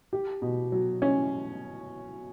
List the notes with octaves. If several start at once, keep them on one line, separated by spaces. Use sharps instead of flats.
G4
B2
F#3
C#4